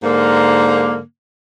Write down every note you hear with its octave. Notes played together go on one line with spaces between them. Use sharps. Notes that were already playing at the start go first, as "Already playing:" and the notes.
G#2 D3 A#3